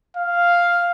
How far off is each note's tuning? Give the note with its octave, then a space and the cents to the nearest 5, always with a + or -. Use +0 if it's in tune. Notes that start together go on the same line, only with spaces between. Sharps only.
F5 +0